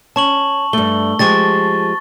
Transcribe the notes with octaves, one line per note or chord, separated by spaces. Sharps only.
C#4 A5 C#6 F#7
G2 A3 G7
F3 G#3 G4 C#6 A6